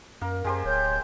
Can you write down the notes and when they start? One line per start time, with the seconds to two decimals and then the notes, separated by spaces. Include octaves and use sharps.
0.21 F#2 A#3 A#4
0.44 F#2 G#3 G4 C5
0.64 D1 C#5 G6